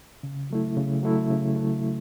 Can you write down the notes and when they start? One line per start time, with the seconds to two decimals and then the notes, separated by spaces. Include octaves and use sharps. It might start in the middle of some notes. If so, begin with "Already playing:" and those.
0.23 C#3
0.50 F#3 A3 E4
0.77 C#3
1.03 F#3 A3 E4
1.30 C#3
1.56 F#3 A3 E4
1.82 C#3